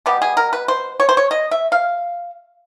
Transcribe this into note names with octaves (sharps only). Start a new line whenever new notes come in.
B2 G3 B3 G4
G#4
A#4
B4
C5
C#5
C5
C#5
D#5
E5
F5